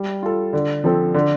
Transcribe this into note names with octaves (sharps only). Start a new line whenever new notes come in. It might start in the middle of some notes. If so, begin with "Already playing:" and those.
Already playing: G3
F4 A4
D3
F3 C4 A4
D3